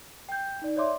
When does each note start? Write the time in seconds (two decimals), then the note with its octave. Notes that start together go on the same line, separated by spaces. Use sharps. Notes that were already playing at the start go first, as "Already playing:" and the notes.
0.29 G5 G6
0.62 D#4 D5
0.76 C#5 D5 E5 C6 D6